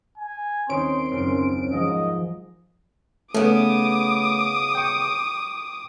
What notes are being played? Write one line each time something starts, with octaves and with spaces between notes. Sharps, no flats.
G#5
D#1 C4 C#4 D#4 C6 G6 D7
F#1
G#2 F3 D#5
C#3 A3 B3 D6 D#6
G5 C#6